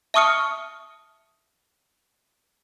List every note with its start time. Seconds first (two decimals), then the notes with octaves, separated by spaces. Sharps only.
0.14 E5 A5 C#6 D#6 F6 C#7